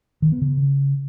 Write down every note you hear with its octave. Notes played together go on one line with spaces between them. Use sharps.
D#3
B3
C#3